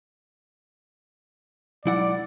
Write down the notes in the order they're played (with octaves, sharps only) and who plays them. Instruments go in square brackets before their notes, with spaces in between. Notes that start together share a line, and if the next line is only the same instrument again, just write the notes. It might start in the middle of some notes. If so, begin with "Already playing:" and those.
[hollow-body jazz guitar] B1 E4 F#5 [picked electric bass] F#3 G#3 [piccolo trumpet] D5